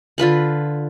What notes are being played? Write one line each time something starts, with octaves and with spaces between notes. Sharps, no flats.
D3 F4 B4 B5